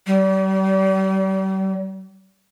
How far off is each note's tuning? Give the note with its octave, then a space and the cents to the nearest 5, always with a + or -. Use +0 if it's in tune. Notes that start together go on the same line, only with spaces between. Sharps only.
G3 -40